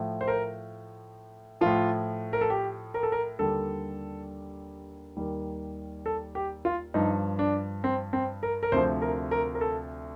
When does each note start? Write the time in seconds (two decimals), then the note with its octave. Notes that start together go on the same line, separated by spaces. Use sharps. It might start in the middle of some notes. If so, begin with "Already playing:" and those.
Already playing: A2 F3
0.21 C5
0.28 A#4
1.61 A2 F3 F4
2.33 A#4
2.41 A4
2.50 G4
2.94 A#4
3.03 A4
3.12 A#4
3.39 D#2 D3 G3 A4
5.17 D#2 D#3 G3
6.06 A4
6.35 G4
6.65 F4
6.94 G2 F3 D#4
7.39 D4
7.84 C4
8.13 C4
8.43 A#4
8.63 A#4
8.72 D2 C3 F3 C5
9.02 A#4
9.31 A#4
9.55 A#4
9.61 A4